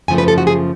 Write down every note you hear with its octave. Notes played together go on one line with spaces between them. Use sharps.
F#2 C#3 F3 A3 G#5
B4
A4
F#4
G#4